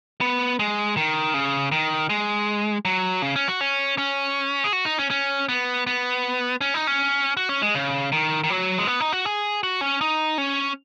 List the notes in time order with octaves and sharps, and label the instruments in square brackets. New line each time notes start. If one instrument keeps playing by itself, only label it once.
[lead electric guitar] B3
G#3
D#3
C#3
D#3
G#3
F#3
C#3
C#4
F#4
C#4
C#4
G#4
F#4
D#4
C#4
C#4
B3
B3
C#4
D#4
C#4
F#4
C#4
G#3
C#3
D#3
D#3
F#3
G#3
B3
D#4
F#4
G#4
F#4
C#4
D#4
C#4